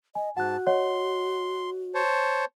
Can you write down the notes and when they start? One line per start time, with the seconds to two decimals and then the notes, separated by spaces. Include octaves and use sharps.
0.15 D#5 G#5
0.37 G#2 F#4 F#5 A5 F#6
0.67 C#5 D#5 F#5 C6
1.95 C5 C#5 A5